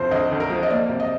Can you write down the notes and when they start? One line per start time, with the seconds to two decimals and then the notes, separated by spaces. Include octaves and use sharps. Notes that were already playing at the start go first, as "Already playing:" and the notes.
Already playing: D2 C3 F3 G4 C5
0.11 D2 D#5
0.31 D2
0.40 A#4
0.50 F3
0.63 D#5
0.70 A#3 D5
0.89 C3
1.00 D#5